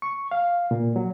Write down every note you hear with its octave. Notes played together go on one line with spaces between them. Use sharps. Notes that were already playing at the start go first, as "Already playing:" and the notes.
C#6
F5
A#2
F#3